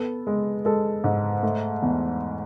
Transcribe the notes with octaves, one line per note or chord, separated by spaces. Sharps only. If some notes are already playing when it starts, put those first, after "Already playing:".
Already playing: B3 A4
G#3
G#3 A4
G#2
A3
E2